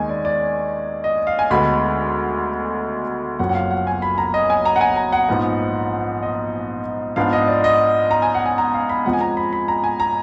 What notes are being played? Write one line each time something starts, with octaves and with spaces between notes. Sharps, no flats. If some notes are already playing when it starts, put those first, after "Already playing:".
Already playing: D#2 D#3 G#3 G#5
D5
D5
D#5
F5
G#5
D2 D3 G#3 B3 B5
F#1 F#2 F3 A#3 F#5
F#5
F5
F#5
G#5
B5
A#5
D#5
G#5
A#5
F#5
G#5
A#5
F#5
A#1 G#2 F3 B3 D#4
D#5
G#2 F3 B3 D4 F5
D#5
D5
D#5
A#5
G#5
F#5
G#5
A#5
F5
B5
F2 F3 G#3 F#5
G#5
A#5
B5
B5
A#5
G#5
A#5